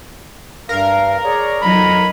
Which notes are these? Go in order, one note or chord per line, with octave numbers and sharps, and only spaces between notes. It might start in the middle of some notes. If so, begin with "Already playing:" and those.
G2 A#4 F5
G#4 C#5 D5
F2 F#3 D#4 B5